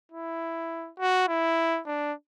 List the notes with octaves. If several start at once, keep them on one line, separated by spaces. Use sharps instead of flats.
E4
F#4
E4
D4